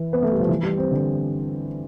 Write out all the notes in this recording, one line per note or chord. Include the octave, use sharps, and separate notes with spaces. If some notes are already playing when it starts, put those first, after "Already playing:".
Already playing: E3
B3
A3
G3
F3
E3
G3
C4
D3